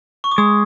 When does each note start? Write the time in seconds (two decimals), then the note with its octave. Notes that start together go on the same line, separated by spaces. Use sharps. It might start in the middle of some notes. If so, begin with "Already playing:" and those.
0.24 C#6
0.32 D6
0.38 G#3 D#6